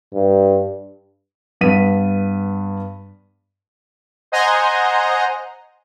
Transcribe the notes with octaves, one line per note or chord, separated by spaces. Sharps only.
G2
G2 B3 B6 D#7
C5 D#5 F#5 G#5 A#5 C6